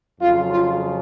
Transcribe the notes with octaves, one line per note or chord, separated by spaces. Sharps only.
F2 C#3 F#3 F4
F4